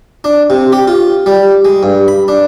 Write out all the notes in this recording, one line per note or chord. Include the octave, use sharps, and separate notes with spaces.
D4
C3
G4
F4
G3
G#3
G2
B5
D4